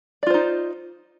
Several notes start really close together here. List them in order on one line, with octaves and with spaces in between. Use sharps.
D5 F4 C5 D#4